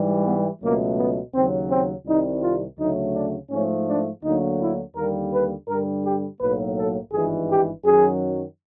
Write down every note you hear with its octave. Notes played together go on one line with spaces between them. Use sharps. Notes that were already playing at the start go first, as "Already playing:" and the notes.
Already playing: G#2 E3 G3
B3
C#2 B2 F#3 A3 A#3
B3
D#2 C#3 F#3 C4
C4
C2 C3 D#3 G3 D#4
F4
D2 C#3 F#3 A3 D#4
D4
G#2 F3 A3 C#4
D4
D2 D3 F#3 A#3 D#4
E4
D#2 D3 G3 A#3 A#4
B4
G2 D3 G3 A#4
G4
B1 A2 F#3 A#3 B4
A4
G#1 G2 E3 G#3 G#4
G4
F#2 D#3 F#3 G#4